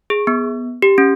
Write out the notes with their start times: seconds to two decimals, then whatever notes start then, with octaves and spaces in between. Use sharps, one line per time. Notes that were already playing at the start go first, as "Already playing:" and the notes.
0.10 G#4
0.27 B3
0.82 G4
0.98 C#4